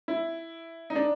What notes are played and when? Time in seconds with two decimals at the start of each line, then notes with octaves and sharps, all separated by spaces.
0.08 E4
0.90 D#4
0.96 D4